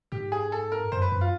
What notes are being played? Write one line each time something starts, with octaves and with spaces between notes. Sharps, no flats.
G#2 G4
G#4
A4
A#4
F#2 C5
B4
F#2
F4